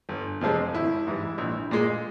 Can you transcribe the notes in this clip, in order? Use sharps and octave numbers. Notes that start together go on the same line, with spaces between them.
G1
F2 C3 F3 G#3
G#1 E4
G#2 E3 G3
A#1
A#2 G#3